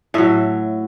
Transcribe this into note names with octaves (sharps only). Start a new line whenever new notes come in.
A2 F#3 E5